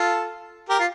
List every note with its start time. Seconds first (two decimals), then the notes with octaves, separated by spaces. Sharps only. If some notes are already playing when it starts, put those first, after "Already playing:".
Already playing: F4 A4
0.69 G4 A#4
0.79 F4